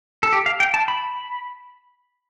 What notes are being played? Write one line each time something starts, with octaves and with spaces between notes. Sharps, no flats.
A4
G4
F5
G5
A5
B5